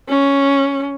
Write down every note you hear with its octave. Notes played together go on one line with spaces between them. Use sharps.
C#4